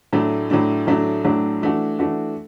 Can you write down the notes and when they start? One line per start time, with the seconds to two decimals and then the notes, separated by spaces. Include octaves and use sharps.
0.13 A2 F#3 A3 D4
0.50 A2 F#3 A3 D4
0.87 A2 F#3 A3 D4
1.24 A2 F#3 A3 D4
1.62 E3 A3 D4 F#4
1.99 E3 A3 D4 F#4